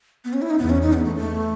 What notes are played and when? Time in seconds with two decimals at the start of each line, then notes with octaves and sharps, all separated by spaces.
0.25 B3
0.33 C#4
0.42 E4
0.50 D#4
0.58 E2 B3
0.70 C#4
0.82 D#4
0.93 B3
1.05 A3
1.16 A3